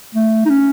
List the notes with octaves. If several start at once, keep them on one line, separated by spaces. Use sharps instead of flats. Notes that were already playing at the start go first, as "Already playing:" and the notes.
A3
D#4
C#4